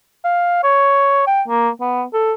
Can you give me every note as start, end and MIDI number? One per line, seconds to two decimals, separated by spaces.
0.25 0.61 77
0.64 1.23 73
1.27 1.42 79
1.48 1.70 58
1.81 2.03 59
2.14 2.33 69